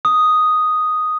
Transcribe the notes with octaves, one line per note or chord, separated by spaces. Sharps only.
D#6